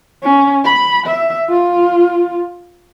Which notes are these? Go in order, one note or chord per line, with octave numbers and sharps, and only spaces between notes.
C#4
B5
E5
F4